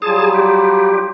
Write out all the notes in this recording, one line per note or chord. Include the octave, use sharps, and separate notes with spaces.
F#3 G3 F4 G#4 A5
G4